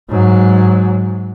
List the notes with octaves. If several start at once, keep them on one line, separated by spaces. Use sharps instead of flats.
G#2 F#3